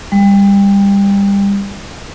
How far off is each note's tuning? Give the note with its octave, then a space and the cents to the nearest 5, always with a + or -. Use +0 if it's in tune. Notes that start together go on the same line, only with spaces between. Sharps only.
G3 +25